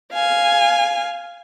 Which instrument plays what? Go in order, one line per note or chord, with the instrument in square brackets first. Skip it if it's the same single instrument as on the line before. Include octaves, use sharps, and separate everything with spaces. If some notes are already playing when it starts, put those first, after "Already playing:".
[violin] F5 G#5